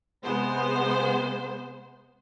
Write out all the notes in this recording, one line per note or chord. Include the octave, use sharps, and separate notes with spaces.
C3 G#3 B3 C5